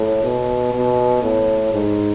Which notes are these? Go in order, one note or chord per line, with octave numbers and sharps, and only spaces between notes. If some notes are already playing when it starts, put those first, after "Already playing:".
Already playing: A2
B2
B2
A2
G#2